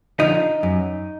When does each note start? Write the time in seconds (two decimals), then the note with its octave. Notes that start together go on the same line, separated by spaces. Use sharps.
0.20 D3 F3 D#4
0.63 F#2